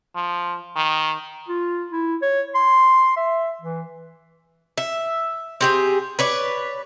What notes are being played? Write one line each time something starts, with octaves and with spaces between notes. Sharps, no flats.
F3
D#3
F4
E4
C#5
C6
E5
E3
E5
C4 G4 G#4
B4 C#5 D5